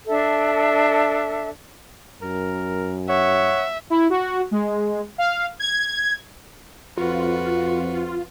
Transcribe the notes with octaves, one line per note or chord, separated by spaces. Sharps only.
D4 A4 E5
F#2 A#4
C#5 E5 F#5
E4
F#4
G#3
F5
G#6
F2 F4 F#4 B4